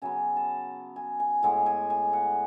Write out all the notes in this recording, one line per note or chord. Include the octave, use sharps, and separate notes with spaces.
C#3 F#3 B3 G#5
A5
G#5
G#5
A2 G#3 B3 F#5
G#5
G#5
F#5